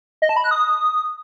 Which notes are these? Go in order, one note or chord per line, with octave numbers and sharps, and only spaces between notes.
D#5
A5
B5
F#6
D#6